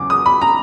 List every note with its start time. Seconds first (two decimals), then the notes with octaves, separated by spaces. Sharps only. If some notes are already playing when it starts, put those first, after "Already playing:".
Already playing: E2 C#3 F#3 D6
0.10 D#6
0.26 B5
0.42 A#5